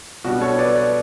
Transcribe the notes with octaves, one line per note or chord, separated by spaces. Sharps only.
B2 G3 D4 F#4
A4 C#5
B4 D5
B4 D5